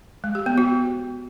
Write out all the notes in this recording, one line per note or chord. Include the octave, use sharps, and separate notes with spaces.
G#3
G4
B3
F#4